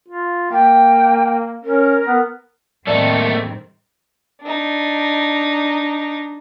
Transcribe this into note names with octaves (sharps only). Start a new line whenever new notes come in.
F4
A#3 G5
C#4 A#4
B3
A2 D#3 G3 A3 A#3 C4 A4 D5
D4 D#4